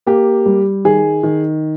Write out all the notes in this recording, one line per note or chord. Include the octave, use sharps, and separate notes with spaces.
A#3 G4
G3
D#3 G#4
D#3